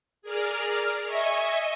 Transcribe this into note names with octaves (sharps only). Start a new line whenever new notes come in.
G#4 A#4 D5 F6
D#5 E5 G#5 C#6